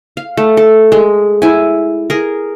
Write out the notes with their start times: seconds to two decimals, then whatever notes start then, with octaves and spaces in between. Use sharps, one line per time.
0.17 F5
0.37 A3
0.57 A4
0.92 G#3
1.42 E4 G#5
2.10 G#4 A#4